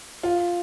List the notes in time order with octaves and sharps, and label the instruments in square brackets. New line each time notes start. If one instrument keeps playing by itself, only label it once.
[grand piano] F4